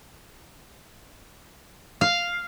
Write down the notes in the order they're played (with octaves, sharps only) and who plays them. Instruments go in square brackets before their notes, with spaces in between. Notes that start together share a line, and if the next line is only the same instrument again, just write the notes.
[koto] F5